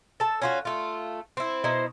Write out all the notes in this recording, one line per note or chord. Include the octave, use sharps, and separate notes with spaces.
A4 A5
C#4 F4 F#4
A3 F4
C4 E4
B2 D#4 E4 C5